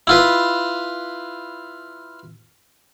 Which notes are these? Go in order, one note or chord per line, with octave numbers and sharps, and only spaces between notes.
E4 F4 B4